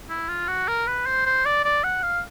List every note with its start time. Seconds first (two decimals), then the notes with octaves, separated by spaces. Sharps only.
0.09 E4
0.29 F4
0.48 F#4
0.68 A#4
0.87 B4
1.06 C5
1.26 C5
1.45 D5
1.65 D5
1.84 F#5
2.03 F5